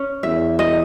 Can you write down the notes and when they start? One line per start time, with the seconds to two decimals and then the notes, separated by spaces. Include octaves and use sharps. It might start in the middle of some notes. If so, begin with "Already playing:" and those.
Already playing: C#4
0.23 E2 E5
0.59 D#5